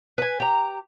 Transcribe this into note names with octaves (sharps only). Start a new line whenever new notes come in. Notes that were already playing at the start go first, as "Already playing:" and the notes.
B4 G#5
G4 A#5